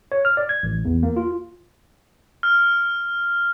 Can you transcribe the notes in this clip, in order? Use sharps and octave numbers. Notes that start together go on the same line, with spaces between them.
C#5
F6
D5
G#6
A1
E2
A#3
F4
F6